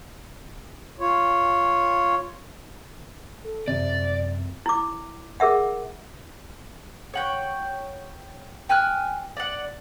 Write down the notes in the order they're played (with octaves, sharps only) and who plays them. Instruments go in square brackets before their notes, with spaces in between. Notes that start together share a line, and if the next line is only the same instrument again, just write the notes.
[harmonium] F4 C#5
[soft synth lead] A4
[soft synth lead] F#2 [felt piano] C3 [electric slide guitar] D5
[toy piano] E4 D6
G#4 A#4 E5 F#5
[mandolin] C#5 F#5 G5
G5 G#5 F6 F#6
D5 F#5